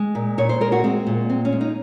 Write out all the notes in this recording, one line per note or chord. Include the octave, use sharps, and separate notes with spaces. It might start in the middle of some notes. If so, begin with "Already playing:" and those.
Already playing: G#3
A#2
A#2 C#5
C5
G#3 A#4
F#4
G#3 C4
A#2
G#3 C4
C#4
G#3
D#4